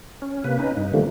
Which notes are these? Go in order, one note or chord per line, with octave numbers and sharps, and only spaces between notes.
C#4
C3 A#3 B4
C#4 D#4 B4
G2 D#4
D3 D#3 F3 G3 A3 A#3